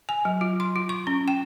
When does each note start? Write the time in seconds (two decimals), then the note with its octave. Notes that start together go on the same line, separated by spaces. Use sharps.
0.09 G#5
0.25 F#3
0.41 F4
0.60 C6
0.76 F4
0.89 C#6
1.07 C#4
1.28 G5